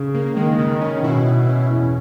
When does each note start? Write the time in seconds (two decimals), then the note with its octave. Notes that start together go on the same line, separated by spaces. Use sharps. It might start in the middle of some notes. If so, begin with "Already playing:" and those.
Already playing: C#3
0.14 A#3
0.36 D#3 G#3
0.58 C#3
0.81 C#4
1.04 B2 E4
1.26 E4
1.49 C#4
1.70 E2